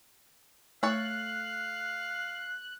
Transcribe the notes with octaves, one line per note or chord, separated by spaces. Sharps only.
A3 A4 C#5 F5 A5 F#6